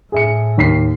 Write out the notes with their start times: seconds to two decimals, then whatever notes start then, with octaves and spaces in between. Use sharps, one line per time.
0.12 A2 G#4 E5 C#7
0.58 D#2 B6 C7